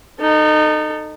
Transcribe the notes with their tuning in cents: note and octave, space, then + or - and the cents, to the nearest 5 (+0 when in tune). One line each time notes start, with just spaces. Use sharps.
D#4 -25 A4 +10